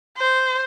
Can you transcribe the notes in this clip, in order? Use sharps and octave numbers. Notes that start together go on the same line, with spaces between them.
C5